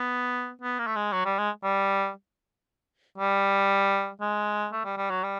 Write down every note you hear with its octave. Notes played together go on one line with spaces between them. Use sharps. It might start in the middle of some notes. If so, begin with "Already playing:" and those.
Already playing: B3
B3
A#3
A3
G#3
F#3
G3
G#3
G3
G3
G#3
A3
G3
G3
F#3
G3